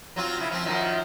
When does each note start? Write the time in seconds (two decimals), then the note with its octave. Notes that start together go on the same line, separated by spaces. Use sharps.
0.16 F#3 C4 F4
0.38 C#3 E4
0.51 F3 C4
0.65 F#2 D#3 F3